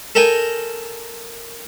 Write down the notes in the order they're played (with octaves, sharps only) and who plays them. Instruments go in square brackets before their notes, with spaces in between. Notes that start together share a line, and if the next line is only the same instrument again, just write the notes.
[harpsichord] A4 A#4 D#5 G5 G#5